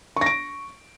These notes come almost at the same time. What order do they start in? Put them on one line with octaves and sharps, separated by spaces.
C#6 A#6 D7